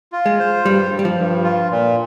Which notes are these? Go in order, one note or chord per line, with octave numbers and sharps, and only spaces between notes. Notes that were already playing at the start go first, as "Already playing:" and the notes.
F4
G#3
C5
G2 G3
G2
G3
F3
G2
F4
A#2